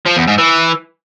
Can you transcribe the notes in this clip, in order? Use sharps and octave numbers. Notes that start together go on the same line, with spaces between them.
F3
E2
G#2
E3